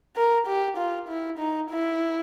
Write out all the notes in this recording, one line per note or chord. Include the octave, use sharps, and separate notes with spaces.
A#4
G4
F4
E4
D#4
E4